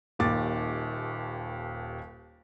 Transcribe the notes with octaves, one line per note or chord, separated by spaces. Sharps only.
D#1 D#2 D6 A6